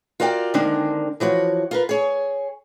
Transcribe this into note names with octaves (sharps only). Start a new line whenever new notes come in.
F4 F#4 A#4 D5 E5 G5
D3 D#3 G#3 A#3 C4 D4
E3 F3 F#4 C#5
F4 A#4 B4
G#4 C#5